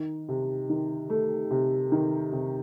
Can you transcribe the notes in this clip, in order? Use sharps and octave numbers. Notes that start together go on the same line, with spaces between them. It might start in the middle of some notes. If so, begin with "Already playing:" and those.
Already playing: D#3
C3
D#3
A3
C3
D#3
C3